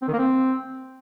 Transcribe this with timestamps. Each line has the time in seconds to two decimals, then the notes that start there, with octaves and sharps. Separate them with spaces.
0.02 C4
0.07 D#3
0.13 A#3
0.18 C4